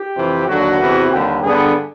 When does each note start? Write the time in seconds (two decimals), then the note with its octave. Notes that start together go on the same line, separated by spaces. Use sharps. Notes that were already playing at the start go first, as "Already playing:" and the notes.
Already playing: G4
0.16 F2 C3 E3
0.47 D#2 D3 F#3 F#4
0.79 E2 C3 E3
1.11 D#2 D3 G3 G4
1.42 G2 D3 G3 B3 G#4